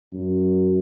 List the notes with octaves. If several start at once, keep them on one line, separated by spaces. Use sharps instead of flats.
F#2